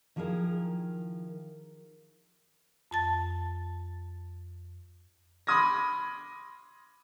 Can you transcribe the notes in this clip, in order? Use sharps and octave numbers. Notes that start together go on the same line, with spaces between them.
D#3 F3 E4 G#4 A#4
F2 A5 A6
B5 C6 D6 D#6 G#6 A#6